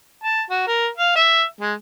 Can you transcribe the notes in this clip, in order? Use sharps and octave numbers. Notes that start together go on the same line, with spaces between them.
A5
F#4
A#4
F5
E5
G#3